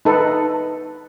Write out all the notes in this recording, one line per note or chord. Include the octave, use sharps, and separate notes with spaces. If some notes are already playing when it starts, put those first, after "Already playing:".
D#4 A4 B4